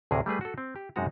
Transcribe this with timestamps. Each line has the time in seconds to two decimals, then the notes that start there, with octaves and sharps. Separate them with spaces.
0.11 D2 A2 C3 G#4 A#4
0.26 G3 A3 G#4 B4
0.41 F#4 A4
0.58 C4
0.76 G4
0.96 F#2 C3 G#3 D#4 F#4 A#5